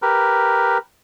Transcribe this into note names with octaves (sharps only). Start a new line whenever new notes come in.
G4 A#4 B4